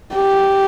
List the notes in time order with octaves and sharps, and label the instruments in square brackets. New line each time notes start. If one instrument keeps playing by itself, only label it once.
[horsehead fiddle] G4